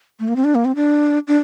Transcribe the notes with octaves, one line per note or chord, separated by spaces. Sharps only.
A3
A#3
C4
D4
A#3
C4
D4
D4